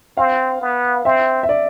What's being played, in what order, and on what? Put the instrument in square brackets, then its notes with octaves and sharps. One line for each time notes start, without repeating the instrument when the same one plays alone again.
[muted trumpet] C4 [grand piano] F5
[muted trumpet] B3
[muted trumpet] C4 [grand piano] E5
[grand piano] E5
D5